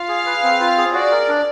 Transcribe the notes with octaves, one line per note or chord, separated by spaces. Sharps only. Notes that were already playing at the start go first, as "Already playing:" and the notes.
Already playing: F4 F5
G#4
B4
C4
F4
G#4
F#4 D5
A#4
D4